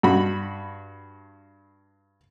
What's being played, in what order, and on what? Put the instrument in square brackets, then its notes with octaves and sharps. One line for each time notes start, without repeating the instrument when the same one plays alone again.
[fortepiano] G2 F#4 B5